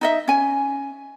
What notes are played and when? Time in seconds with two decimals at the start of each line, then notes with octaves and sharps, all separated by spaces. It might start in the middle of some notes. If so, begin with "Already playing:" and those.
0.01 D#4 D#5 E5
0.28 C#4 G#5